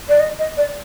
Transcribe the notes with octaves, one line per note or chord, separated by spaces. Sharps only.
D5
D#5
D#5
D5